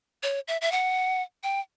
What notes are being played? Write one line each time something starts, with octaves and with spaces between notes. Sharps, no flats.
C#5
E5
E5
F#5
G5